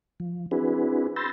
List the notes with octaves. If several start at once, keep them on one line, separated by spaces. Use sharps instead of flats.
F3
C4 D4 E4 F#4 G#4 B4
B5 C6 E6 G6 A6 A#6